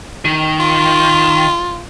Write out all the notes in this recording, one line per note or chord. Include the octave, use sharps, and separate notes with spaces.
D#3
F4